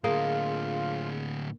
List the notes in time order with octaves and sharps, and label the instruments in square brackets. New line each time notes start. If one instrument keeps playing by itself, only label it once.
[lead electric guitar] A2 D3 [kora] A#3 D#5 [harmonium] F4 [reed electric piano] G#4